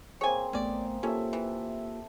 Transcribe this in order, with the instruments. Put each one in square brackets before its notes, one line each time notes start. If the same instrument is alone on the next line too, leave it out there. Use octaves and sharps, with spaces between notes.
[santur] A#3 C4 G#4 [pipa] C#5 G#5
[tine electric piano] A1 A3 B3 [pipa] C#4 D5
[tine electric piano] A#3 F4 G4 [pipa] C#4 [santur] A4 E5
[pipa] E3